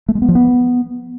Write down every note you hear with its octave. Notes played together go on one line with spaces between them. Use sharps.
A3
G#3
B3
F3
B3